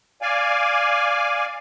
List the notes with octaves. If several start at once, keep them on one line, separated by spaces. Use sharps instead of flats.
D5 F5 G#5